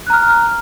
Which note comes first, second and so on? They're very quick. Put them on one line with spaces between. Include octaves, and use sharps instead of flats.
F#6 A#5 F6